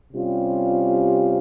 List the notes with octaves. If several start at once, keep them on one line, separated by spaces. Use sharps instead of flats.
C3 G3 C#4 F4